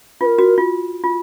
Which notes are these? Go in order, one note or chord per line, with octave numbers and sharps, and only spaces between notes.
F4 A#4 B4
F#4
F4
F4